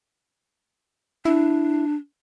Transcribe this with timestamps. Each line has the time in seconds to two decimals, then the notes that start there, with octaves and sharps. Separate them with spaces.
1.25 D4 E4